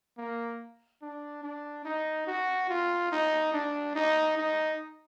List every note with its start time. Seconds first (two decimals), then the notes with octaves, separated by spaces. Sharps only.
0.17 A#3
1.02 D4
1.43 D4
1.85 D#4
2.27 F#4
2.69 F4
3.12 D#4
3.53 D4
3.95 D#4
4.37 D#4